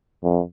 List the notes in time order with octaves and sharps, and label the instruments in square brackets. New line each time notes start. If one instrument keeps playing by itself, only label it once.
[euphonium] F2